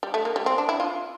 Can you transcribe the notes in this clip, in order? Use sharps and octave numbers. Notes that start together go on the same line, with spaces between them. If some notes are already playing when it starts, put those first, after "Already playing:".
G3
A3
A#3
G3
C4
D4
E4
F4